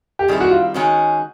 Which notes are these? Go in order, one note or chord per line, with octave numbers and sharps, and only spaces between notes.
G4
D#3 G3 C4 E4 G#4
F#4
F4
D#3 G#3 C#4 F#4